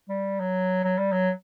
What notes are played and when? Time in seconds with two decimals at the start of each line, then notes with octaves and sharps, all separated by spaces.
0.09 G3
0.40 F#3
0.84 F#3
0.98 G3
1.12 F#3